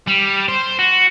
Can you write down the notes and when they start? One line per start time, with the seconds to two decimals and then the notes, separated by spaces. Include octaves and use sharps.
0.08 G3
0.48 C5
0.79 F#4